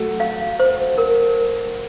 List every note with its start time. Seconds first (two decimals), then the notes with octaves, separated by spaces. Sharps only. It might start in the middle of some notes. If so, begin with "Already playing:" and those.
Already playing: F#3 A3
0.20 F5
0.60 C5
0.98 A#4